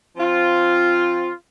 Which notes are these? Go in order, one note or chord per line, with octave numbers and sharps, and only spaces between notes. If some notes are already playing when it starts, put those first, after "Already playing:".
F3 C4 F4